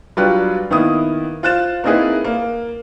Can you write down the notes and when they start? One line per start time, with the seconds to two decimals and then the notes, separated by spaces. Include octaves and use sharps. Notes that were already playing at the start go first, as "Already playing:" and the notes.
0.17 F#3 G3 D4 F4 B4
0.71 D#3 A#3 B3 E4 D#6
1.43 F4 C5 F#6 A6 E7
1.84 A#3 C4 D#4 E4 G#4 B4
2.24 A#3